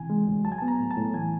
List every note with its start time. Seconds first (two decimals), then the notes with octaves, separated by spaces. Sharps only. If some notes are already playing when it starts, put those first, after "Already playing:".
Already playing: C3 E3 G#5
0.10 G#3
0.27 D2
0.44 F#3 A5
0.52 G#5
0.58 A5
0.62 B3
0.68 A#5
0.80 A2
0.91 A5
0.97 A2
1.14 E3 G#5